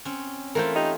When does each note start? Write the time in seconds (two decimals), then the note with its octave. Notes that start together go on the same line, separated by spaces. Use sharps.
0.05 C4 C#4
0.55 E3 A3 F4 A#4 C5
0.76 D#4 G4